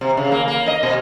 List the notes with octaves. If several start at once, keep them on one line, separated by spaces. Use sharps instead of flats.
C3
C#3
A#3
A#3
D#5
B2